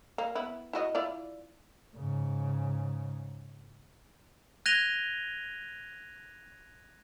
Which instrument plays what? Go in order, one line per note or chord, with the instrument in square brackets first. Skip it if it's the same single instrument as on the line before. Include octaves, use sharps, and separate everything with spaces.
[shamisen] A#3
B3 E4
E4 F#4 D#5
E4 F4 D5
[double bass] G#2 C#3
[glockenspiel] F#6 G#6 A#6 D#7 F7 G7